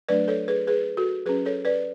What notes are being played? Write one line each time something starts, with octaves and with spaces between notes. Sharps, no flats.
F#3 A3 D4 B4 D5
A4 C#5
G#4 B4
G#4 B4
F#4 A4
F#3 C#4 G#4 B4
A4 C#5
B4 D5